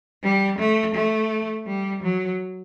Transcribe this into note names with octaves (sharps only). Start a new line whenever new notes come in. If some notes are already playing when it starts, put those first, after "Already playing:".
G3
A3
A3
G3
F#3